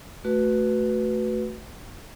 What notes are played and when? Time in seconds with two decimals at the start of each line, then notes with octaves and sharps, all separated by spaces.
0.24 A3 F#4 B4